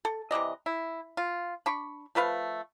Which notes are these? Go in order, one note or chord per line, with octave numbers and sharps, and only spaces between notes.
A4
C3 E3 D5 D#5
E4
F4
D4 B5 C#6
F3 A3 B4 F5